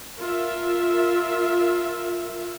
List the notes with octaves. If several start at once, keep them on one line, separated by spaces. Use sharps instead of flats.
F4 A#4 E5